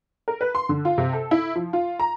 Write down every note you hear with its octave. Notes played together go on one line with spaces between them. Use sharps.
A#4
B4
C6
D3
F4
C3
A4
E4
F3
F4
A#5